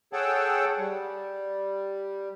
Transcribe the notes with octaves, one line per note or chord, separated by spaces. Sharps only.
G#4 A4 C#5 F#5 G5 A5
G3